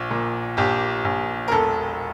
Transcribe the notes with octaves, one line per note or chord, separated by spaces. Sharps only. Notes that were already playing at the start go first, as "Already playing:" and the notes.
Already playing: A#1
A#2
A#1 G4
A#1
A#4
E1 A4